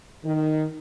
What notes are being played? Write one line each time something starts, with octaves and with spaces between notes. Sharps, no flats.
D#3